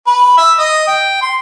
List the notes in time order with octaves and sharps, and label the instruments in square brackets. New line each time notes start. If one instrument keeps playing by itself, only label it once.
[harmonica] B4
E5
D#5
G5
C6